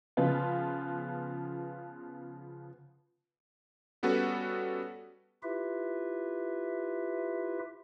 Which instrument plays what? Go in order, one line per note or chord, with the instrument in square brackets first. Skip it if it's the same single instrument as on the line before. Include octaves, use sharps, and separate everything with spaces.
[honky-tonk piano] C#3 F3 B3 F4 B4
[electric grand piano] G3 B3 C#4 F#4 A4 B4
[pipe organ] E4 F4 G4 B4 E5